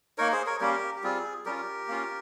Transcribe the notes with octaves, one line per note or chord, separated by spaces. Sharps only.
A#3 D#4 A#4 C#5
G#4 C5
A#4 C#5
G3 A#3 C#4 G4 A#4
G4
G3 C4 F4 G#4
G3 C#4 F4 G4 A#4
A#3 C#4 F4